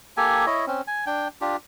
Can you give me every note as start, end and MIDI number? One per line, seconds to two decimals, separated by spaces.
0.17 0.46 58
0.17 0.46 67
0.17 0.46 69
0.17 0.46 80
0.46 0.65 64
0.46 0.65 73
0.46 0.65 75
0.67 0.81 60
0.67 0.81 61
0.87 1.05 80
1.06 1.28 62
1.06 1.28 79
1.41 1.56 62
1.41 1.56 65
1.41 1.56 67